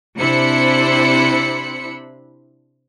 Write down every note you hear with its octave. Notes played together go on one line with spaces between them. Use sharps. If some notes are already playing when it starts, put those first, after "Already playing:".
C3 D4 E4 C5 B5 C#7